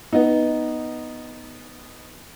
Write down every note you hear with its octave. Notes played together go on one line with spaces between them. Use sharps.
B3 D#4